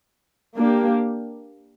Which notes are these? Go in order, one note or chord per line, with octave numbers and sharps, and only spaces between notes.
A#3 D4 G4